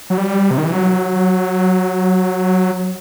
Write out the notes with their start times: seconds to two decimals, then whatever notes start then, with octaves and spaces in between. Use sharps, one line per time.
0.10 F#3
0.18 G3
0.51 C3
0.58 D#3
0.65 E3
0.72 F#3